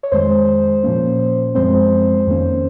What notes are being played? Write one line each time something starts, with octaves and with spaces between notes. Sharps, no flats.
C#5
F2 D#3 G#3 C5
A#2 F3 A#3 C#4
F#2 F3 G#3 C4 C5
F2 D#3 A#3 C#4